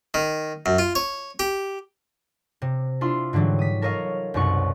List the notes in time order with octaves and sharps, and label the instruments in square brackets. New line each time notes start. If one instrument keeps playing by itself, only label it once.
[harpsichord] D#3
F#2
F4
C#5
G4
[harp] C3
D4 E4 F4 C6
G#2 D3 E3 F#3 G3
D#6 B6
A4 A#4 C#5 D#5 F5
C2 F#2 B2 D#4 F#5 C#6